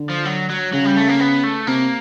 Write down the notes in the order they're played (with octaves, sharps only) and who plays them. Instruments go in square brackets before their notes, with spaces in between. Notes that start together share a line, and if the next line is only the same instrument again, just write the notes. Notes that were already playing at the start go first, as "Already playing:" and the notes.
Already playing: [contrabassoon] D3
[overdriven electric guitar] F3
F#3
F#3
[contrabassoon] C#3 [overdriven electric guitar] F#3
[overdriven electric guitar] G3
A3
A#3
B3
A3
[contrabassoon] C3 [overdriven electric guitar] A#3